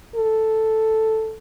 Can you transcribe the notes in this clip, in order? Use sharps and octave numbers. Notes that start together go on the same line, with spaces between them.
A4